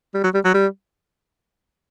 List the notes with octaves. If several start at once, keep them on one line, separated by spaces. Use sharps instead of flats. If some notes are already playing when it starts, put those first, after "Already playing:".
G3
F#3
G3
F#3
G3